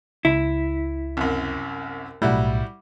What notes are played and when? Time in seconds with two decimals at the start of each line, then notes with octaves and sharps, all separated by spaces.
0.25 C#2 E4
1.17 C2 F#2
2.22 B1 A2 G3 E4 F#4